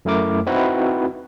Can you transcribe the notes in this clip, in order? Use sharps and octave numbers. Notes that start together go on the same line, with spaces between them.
F#2 A3 E4 A#4 D6
C4 D#4 E4 F#4 B4 C5